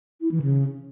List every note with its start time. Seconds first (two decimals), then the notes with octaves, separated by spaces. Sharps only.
0.21 E4
0.32 E3
0.42 C#3